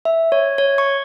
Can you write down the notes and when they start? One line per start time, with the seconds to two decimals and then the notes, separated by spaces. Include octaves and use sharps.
0.05 E5
0.32 C#5
0.58 C#5
0.78 C#6